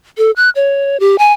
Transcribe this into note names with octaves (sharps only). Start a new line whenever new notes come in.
A4
F#6
C#5
G4
G#5